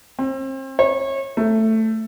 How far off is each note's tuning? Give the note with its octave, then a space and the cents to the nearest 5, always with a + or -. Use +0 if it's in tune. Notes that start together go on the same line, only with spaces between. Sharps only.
C4 +35
C#5 -30
A3 +10